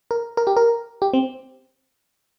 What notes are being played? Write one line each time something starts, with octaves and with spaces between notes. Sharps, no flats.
A#4
A#4
G4
A#4
G4
C4